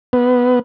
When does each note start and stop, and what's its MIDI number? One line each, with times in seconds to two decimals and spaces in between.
0.13 0.59 59